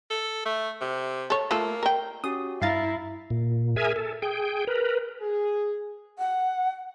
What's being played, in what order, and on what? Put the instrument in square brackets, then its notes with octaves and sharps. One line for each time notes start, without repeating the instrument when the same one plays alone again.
[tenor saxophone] A4
A3
C3
[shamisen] A4 C#5
[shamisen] A3 F4 A4 [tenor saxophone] A#3
[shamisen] A#4 G5
[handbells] C#4 F#4 G4 [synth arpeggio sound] D#6
[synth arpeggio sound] G2 F5 A6 [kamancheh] E4 [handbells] A#5 A#6 C7
[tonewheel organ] A#2
G#4 A#4 E5 G#5
A4
G#4 G5
A#4 B4
[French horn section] G#4
[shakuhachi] F#5